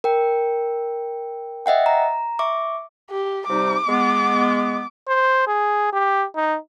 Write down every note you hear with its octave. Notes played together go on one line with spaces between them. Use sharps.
A#4 G5
D#5 E5 F#5 G5
A#5
E5 C#6 D6
G4
C3 G3 D#4 D6
G#3 B3
C5
G#4
G4
D#4